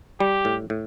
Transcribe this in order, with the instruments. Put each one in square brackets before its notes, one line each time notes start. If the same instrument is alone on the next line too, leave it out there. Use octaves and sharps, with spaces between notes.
[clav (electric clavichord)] G3 [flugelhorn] G4
[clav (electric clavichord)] A2
A2